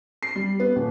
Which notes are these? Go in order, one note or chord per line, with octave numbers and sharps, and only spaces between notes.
C7
G3
B3
D#1